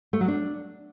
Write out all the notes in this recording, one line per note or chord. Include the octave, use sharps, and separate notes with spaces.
A3
F#3
D4